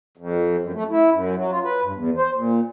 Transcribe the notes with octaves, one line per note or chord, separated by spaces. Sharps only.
F2
F#2
A3
E4
F#2
F#3
F4
B4
G2
E2
C5
A#2